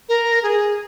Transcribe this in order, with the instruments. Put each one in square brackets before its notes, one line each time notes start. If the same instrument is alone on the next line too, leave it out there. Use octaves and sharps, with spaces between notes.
[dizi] A#4
G#4